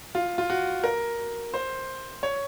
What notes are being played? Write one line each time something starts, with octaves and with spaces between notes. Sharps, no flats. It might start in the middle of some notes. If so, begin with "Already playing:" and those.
F4
F4
F#4
A#4
C5
C#5